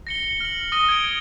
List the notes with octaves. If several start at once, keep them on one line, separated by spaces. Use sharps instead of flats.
A#6 C#7 G7
F6 F#7
D#6 A#6 D#7 G7
G#6 D7